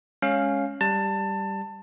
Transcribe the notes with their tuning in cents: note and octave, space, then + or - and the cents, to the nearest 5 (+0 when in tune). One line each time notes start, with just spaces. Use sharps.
G#3 -5 C#4 +0 F5 +0
G3 +0 A5 +20